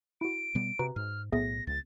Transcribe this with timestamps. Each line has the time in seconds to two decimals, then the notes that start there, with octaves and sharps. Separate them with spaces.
0.21 E4 F#4 D7
0.55 B2 G3 B3
0.79 C3 F#4 B4 A#5
0.96 G#2 F6
1.32 B1 A2 B3 G#4 E5 A#6
1.67 C#2 A6